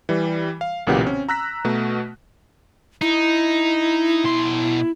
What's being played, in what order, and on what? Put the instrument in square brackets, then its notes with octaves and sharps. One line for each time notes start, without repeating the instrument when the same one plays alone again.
[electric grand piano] E3 G3
F5
B1 A#2 C#3 E3 G4 F#5
C4 C#4
A#5 E6 F#6 A#6 B6
B2 A3 F#4
[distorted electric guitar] D#4 [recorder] E4
[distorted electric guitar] B2 C6